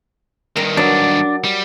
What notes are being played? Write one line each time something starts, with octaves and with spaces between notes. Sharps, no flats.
G2 D#3 A#4
F#3 D4
G3